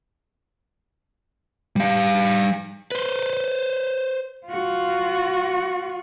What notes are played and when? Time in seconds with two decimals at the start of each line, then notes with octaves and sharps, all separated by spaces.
1.76 G3 F5
2.92 B4 C5
4.47 F4 F#4